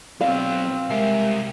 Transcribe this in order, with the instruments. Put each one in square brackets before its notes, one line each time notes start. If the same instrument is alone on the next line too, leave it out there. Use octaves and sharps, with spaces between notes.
[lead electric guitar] F#3 B3 [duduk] C4 [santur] F5
[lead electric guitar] C2 G4 [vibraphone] G#3 A#4 E5